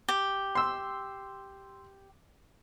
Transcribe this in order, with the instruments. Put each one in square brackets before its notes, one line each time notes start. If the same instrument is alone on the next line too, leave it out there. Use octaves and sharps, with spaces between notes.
[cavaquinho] G4
[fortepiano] C6 E6